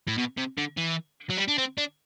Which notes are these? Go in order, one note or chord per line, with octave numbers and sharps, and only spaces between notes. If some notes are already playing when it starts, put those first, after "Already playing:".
A2
B2
C3
D3
E3
F#3
G3
D4
C4
D4